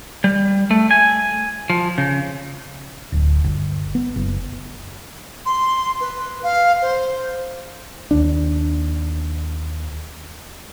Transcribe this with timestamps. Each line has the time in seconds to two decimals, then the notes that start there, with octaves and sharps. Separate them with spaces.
0.24 G3
0.71 A3
0.91 G#5
1.70 F3
1.98 C#3
3.12 D1
3.44 G1
3.95 B3
4.16 F#1
5.46 C6
6.01 B4
6.43 F5
6.82 C5
8.11 D#2 D4